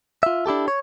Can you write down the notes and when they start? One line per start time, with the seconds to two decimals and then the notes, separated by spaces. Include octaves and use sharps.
0.23 F4 E5
0.46 D4 E4 G4 A4
0.68 C#5